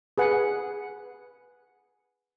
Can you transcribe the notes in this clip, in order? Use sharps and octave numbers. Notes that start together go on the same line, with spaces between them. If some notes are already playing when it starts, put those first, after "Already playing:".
G#4 B4 F#5